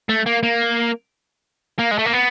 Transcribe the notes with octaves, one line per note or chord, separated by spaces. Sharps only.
A3
A#3
A#3
A#3
G#3
A3
A#3
B3